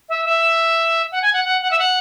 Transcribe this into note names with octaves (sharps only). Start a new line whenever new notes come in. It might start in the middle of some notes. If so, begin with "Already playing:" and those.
E5
E5
F#5
G#5
F#5
F#5
F#5
E5
F#5